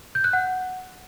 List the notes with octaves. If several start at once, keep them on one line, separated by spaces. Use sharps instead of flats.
G6
F#6
F#5